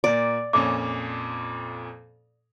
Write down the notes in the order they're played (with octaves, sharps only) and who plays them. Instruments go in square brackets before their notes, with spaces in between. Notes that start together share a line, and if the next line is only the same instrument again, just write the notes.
[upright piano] A#2 A#3 [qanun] D5
[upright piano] F2 A#2 C#4 [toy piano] D6